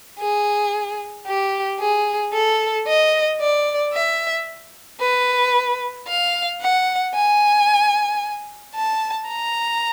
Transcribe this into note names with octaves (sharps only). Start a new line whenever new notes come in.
G#4
G4
G#4
A4
D#5
D5
E5
B4
F5
F#5
G#5
A5
A#5